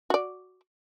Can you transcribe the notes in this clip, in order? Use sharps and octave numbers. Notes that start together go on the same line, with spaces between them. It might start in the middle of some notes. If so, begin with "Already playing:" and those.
F#4 D5